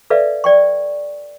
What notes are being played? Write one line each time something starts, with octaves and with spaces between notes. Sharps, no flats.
A4 B4 D5 E5 F5
D5 G5 C#6